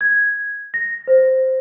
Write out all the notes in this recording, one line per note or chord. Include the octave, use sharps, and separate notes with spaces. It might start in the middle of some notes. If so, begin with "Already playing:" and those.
G#6
A#6
C5